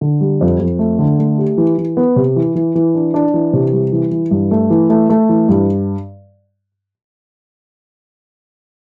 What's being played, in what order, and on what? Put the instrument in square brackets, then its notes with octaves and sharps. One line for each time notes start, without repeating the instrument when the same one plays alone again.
[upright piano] D3
G3
F2
F2
A3
D3
A3
G4
E3
E3
B3
C3
E3
E3
E3
D4
D4
E3
C3
G3
E3
E3
G2
A3
E3
A3
A3
E3
G2